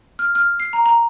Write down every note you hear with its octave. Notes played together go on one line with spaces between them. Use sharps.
F6
F6
C7
A#5
A#5